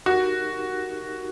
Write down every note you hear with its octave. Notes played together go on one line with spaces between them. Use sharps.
D#4 F#4 G4 A#4